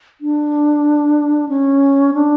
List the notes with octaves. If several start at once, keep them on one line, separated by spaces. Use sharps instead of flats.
D4
C#4
D4